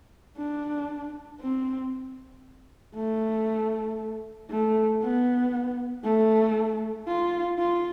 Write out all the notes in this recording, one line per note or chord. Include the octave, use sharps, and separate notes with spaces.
D4
C4
A3
A3
B3
A3
F4
F4